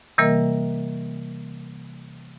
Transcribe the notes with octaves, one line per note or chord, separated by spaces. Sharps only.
C3 E3 G3 A#3 A#4 D#5